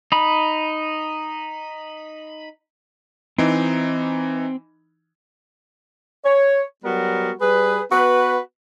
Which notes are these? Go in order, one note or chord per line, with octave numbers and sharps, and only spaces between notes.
D#4 B5
E3 C4 D#4
C#5
F#3 G3 B3 F#4 A#4
G3 G#4 B4
B3 F#4 B4